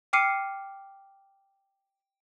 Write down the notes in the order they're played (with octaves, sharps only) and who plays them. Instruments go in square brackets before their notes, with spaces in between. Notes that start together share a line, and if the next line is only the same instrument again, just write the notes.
[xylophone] G5 D6 F6 C7 C#7 D#7